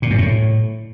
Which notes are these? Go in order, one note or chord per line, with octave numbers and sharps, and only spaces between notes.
A#2
F#2
A2